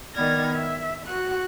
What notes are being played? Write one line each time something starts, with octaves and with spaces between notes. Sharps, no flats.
D#3 B3 D5 F6 G#6 A#6
E5
F#4 F#6